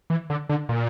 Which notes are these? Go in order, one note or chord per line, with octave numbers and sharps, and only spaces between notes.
E3
D3
D3
A#2